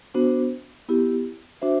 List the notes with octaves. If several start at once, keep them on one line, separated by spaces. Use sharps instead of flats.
B3 D4 F#4 C5
B3 E4 G4
D4 F#4 C5 E5